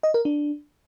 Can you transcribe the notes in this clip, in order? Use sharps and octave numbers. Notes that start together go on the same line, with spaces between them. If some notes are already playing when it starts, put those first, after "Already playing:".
D#5
A#4
D4